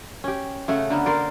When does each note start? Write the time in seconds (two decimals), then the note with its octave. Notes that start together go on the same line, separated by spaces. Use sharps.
0.24 C#4 G4
0.68 C#3 A3 F#5
0.90 D3 A#3 B3
1.06 A#4 C5 D5